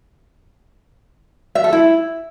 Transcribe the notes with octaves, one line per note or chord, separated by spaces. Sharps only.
E5
A4
E4